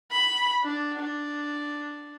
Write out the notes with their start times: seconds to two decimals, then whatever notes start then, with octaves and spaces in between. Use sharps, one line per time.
0.12 B5
0.64 D4
1.00 D4